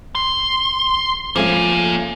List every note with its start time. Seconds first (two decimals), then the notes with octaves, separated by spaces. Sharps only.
0.15 C6
1.36 F3 A3 A#3 C#4 G#5